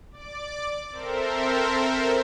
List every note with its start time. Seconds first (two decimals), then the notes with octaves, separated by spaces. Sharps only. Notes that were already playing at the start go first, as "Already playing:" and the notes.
0.11 D5 D6
0.91 C4 A4 A#4 C5 E5